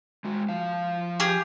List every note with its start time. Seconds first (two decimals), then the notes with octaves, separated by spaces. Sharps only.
0.25 G#3 F#4
0.49 F3 F5
1.20 G4 G#4